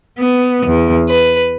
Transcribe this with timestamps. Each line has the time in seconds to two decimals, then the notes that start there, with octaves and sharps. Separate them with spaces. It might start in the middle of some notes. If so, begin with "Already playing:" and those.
0.18 B3
0.64 E2
1.08 B4